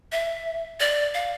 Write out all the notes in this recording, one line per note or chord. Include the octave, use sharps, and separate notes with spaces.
E5
D5
F5